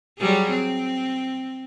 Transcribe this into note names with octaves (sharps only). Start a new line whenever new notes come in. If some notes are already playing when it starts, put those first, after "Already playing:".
F#3 G3 G#4
C4